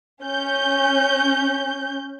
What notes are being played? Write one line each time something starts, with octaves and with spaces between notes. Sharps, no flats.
C#4 G6